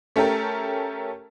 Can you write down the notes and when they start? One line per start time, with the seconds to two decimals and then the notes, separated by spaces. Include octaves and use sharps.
0.16 A3 C#4 G4 A4 A#4